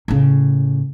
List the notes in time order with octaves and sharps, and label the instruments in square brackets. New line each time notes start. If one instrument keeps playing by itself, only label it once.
[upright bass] A2 C#3